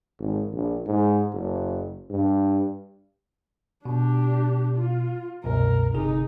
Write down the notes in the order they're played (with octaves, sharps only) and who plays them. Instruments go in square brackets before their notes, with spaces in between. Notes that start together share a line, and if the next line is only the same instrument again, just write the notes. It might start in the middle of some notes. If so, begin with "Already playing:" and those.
[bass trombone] G#1
A#1
G#2
F#1
G2
[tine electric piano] B2 [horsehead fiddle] D4 G4
[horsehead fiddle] F4
[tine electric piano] C2 F#2 B2 [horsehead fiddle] A#4
[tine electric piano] G1 C3 G#4 [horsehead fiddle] D#4